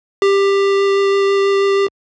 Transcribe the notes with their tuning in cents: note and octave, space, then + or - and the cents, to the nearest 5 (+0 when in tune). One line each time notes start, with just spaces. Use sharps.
G4 +15